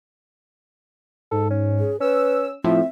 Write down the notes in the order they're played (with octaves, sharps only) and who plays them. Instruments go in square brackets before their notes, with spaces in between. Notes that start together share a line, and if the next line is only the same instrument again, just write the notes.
[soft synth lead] G#2 [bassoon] A4
[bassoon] C#4
[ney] G#4
[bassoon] C#4 [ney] B4 [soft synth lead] E6
[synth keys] A2 F3 [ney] C4 [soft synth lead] E5